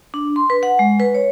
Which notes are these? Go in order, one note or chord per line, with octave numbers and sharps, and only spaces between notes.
D4
C6
B4
F#5
G#3
B4
C#5